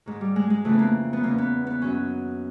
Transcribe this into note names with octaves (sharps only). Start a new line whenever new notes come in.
G#2 D#3
G3
G#3
G#3
F2 C#3 E3 A3
B3
A#3
B3
E2 C#3 E3 A#3
B3
B3
F#2 D#3 C#4